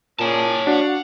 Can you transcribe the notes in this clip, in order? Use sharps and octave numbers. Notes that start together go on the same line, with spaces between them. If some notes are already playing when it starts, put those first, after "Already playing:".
A#2 C#4 G#4 C#5 D5 A5
D4 F#4 F5 F#5